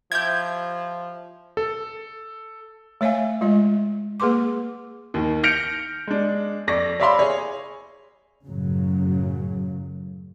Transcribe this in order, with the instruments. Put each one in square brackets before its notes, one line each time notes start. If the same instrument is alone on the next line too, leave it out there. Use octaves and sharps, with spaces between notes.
[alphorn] F3 [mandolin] E4 G4 [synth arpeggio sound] G6 G#6
[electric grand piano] A4
[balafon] A3 C#5 E5 F5 G#5
G#3 F4 D#5
A#3 G#4 B4 C6 D6
[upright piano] D#2 D#3
F6 G6 A#6 C#7 D7 F7
G#3 D4
F2 D5 C#6 A#6
C#5 D5 E5 F5 B5 C6
G#4 C#5
[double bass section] F#2 A2 C#3 F#3